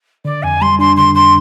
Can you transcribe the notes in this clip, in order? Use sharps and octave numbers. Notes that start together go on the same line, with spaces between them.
D3 D5
F2 G#5
G3 C6
D4 C6
D3 C6
F2 C6